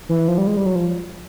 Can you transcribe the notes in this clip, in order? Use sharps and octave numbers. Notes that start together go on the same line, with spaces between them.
E3
F3
G3
G#3
G3
F#3
F3